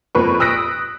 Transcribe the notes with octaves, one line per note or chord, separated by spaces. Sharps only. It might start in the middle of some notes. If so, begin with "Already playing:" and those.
F2 A#3 B4 C#6
D#6 E6 F#6 A#6 B6 D7